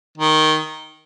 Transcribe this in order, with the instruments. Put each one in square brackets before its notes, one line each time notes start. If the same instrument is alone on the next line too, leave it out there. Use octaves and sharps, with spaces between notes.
[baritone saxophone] D#3